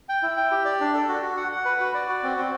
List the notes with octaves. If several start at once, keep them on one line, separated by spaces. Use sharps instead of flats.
G5
E4
G5
G4
D5
D4
A4
F#4
F#4
F#5
F#5
B4
F#4
D5
F#4
C4
C4